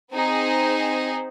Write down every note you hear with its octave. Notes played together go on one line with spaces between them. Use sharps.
C4 D#4 G#4 C5